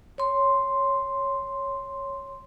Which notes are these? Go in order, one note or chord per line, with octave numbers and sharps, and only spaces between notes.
C#5 C6